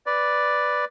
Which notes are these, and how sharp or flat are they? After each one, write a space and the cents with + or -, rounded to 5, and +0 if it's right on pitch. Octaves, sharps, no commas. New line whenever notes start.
B4 +0 D5 +0